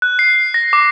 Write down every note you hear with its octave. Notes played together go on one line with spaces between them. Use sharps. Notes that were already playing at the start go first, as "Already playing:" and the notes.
F#6
C7
A#6
D6